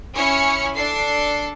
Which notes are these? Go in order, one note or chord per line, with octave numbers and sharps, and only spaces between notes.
C#4 E4 C#5 G#5 F6 C#7
D4 A4 C7